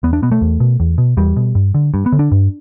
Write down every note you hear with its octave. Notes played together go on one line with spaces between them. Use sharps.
E2 B3
D4
B2 B3
A3
E2
B2
E2
B2
E2 G3
B2
G2
D3
G2
B3
D3
D4
G2